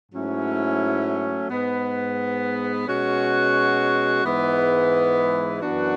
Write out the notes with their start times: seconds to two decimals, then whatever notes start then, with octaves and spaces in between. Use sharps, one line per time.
0.12 G#2 F#3 A3 C#4 E4
1.49 G#2 G#3 B3
2.87 B2 G#3 C#4 F#4
4.24 G#2 E3 G#3 B3
5.61 F#2 E3 B3 D4 F#4